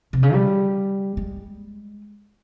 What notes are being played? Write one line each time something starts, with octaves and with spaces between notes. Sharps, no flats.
C3
C#3
G3
G#3